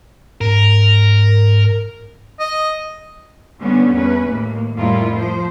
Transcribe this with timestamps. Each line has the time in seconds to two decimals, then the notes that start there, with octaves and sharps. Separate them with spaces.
0.41 G#2 A#4
2.40 D#5
3.61 D3 G3 B3 C#4
3.93 E2 C#4 B4
4.28 D#2 A2 A#3
4.77 F2 A2 G3 E4 F4 A#4
5.14 F3 A3 C5